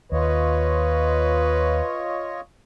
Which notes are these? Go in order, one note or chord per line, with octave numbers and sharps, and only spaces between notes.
D#2 F4 B4 C#5 D#5